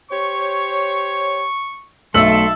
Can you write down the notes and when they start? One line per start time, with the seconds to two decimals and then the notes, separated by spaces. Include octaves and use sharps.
0.11 G4 C5 C#5 C#6
2.14 B1 A3 E5 A5 C6 E6 F#7